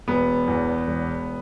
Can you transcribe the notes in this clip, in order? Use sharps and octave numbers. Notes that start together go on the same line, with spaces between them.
E1 B3
E2
E1